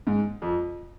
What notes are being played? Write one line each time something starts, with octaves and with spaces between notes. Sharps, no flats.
G#2
F2